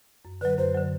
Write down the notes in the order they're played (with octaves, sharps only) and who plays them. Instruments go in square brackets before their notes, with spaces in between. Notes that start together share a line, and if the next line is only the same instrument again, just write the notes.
[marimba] F#2
[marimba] D3 F#3 [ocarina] B4
[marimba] F#2 [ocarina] C5
[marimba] D3 F#3